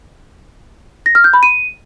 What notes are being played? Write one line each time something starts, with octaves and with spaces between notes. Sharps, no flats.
A#6
F6
G6
B5
D#7